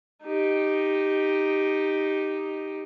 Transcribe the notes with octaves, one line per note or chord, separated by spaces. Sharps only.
D#4 G4